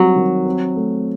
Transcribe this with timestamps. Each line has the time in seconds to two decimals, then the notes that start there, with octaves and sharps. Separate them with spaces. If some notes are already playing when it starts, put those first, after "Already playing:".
Already playing: F#3 G3 C4
0.16 D#3
0.46 C4
0.76 A3